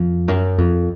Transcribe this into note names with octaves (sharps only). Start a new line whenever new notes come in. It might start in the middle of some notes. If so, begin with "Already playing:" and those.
Already playing: F2
F#2
F2